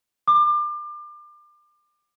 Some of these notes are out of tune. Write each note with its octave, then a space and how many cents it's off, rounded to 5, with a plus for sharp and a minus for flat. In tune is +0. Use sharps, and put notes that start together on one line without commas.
D6 +30